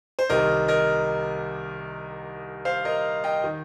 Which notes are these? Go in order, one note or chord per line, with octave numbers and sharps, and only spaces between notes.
C5
C2 C3 D#3 A#4 D#5
A#4 D#5
C5 F5
A#4 D#5
D#5 G5
D#3